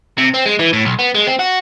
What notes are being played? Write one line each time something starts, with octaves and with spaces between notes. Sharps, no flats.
C3
C4
G#3
E3
A2
B1
B3
G#3
C4
F#4